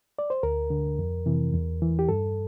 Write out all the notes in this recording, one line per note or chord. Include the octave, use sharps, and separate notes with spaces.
D5
C5
D2 A#4
D3
F2
C3 E3
E2
E3
G4
G2 A4